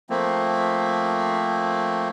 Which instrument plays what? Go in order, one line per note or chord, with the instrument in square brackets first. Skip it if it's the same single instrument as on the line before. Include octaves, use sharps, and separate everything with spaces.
[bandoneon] F3 A3 A#3 C4